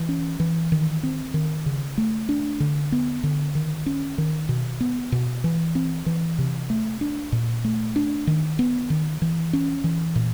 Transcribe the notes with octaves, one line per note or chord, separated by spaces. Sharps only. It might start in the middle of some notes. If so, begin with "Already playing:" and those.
Already playing: E3
C#4
E3
D#3
C4
D#3
C#3
A3
D4
D3
B3
D3
D#3
C#4
D#3
B2
B3
B2
E3
C4
E3
C3
A3
D4
A#2
A3
D4
D#3
B3
D#3
E3
C#4
E3
A#2